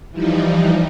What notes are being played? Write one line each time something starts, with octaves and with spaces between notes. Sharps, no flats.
E3 F3 G3 D#4